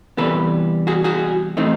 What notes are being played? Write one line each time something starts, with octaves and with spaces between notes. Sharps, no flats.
C3 E3 G3 B3 A4 B4
F#4 G#4
F#4 G#4
A2 E3 A3 C4 D#4